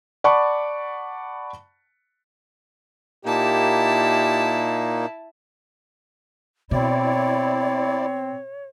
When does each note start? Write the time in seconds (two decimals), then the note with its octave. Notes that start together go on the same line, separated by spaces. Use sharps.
0.24 D5 F#5 A5 B5 C#6
3.25 A#2 A#3 D#4 E4 G4 A5
6.71 B2 C4 E4 C#5 D5